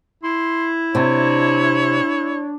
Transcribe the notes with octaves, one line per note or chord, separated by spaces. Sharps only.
E4 C6
C3 D4 C#5